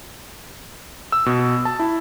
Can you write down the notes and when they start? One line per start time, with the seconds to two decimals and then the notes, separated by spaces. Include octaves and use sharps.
1.12 E6
1.26 B2
1.65 A5
1.79 E4